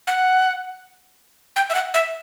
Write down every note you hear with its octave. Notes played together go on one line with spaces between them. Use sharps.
F#5
G5
E5
F#5
E5